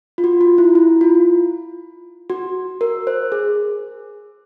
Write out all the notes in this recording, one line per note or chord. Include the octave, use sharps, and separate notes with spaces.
F4
F#4
F4
E4
E4
F4
F#4
A#4
C5
G#4